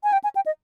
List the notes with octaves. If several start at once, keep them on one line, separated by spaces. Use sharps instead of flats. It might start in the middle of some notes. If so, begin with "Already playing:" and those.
G#5
G5
G#5
G5
D#5